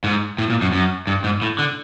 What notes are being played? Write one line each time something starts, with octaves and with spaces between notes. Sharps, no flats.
G#2
A2
A#2
F#2
F#2
G2
G#2
A2
D3